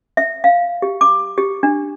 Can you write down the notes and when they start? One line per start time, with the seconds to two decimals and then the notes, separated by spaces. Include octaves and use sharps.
0.17 E5
0.44 F5
0.82 G4
1.01 D6
1.38 G4
1.63 D4